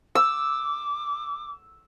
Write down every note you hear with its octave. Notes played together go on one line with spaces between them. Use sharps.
D6 E6